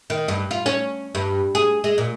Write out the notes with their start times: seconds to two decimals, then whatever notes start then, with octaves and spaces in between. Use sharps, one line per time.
0.10 D#3
0.28 G2
0.51 F4
0.66 C#4
1.15 G2
1.55 G#4
1.84 G#3
1.98 A#2